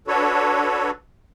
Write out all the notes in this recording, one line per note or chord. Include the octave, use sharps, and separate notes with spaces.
D4 F#4 A4 B4 C#5